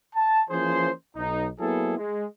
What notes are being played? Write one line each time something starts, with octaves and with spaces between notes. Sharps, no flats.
A5
E3 F3 A#3 C#4 G#4 C5
B1 D#4
F#3 A#3 B3 E4 G#4 A4
G#3